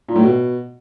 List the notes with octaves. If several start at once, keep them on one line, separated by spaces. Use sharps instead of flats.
A#2
A2
B2